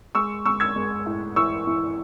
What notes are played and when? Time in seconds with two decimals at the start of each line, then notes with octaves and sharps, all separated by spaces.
0.15 G#3 C#6 E6
0.45 G#3 C#6 E6
0.60 E6 G#6
0.76 G#3
1.06 A2
1.36 E3 C#6 E6
1.67 E3